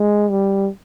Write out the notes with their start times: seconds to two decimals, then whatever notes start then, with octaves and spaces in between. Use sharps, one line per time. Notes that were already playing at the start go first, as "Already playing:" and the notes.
Already playing: G#3
0.30 G3